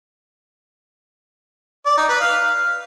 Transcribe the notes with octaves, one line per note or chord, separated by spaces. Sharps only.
D5
D#4
B4
F5